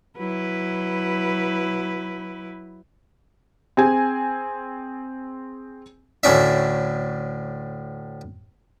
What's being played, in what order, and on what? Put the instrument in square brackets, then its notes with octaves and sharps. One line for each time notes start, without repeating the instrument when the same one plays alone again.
[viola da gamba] F#3 E4 B4
[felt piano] C4 G#4 G#5
[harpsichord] D2 A2 C#4 D4 E5